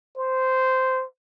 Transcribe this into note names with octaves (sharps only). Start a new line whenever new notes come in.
C5